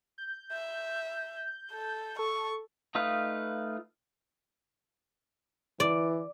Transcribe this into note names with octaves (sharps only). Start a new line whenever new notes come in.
G6
E5
A4
A4 C#6
A3 D#4 F4 B4 F5
E3 D5